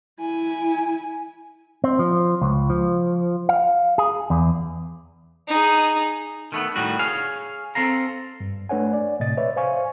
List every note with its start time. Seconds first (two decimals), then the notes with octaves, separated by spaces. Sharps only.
0.19 E4 G#5
1.84 C4
1.99 F3
2.42 C#2
2.70 F3
3.49 F5
3.98 G#4
4.30 E2
5.48 D#4 G#4
6.52 D#3 A3 B3
6.76 A2 D#3 G3 F#4
6.99 G#4 C#5 F5
7.75 C4 A4 F5 A#5
8.40 G2
8.69 A3 D4 B4 C#5 F#5 G#5
8.93 D5
9.20 A2 C3 D#5 A6
9.38 B4 C#5 D5 E5
9.56 C5 F5 G#5 C#6